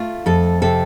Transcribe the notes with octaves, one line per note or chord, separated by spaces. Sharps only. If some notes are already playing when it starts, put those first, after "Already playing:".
Already playing: A3 F4
F2 A4
C3 A4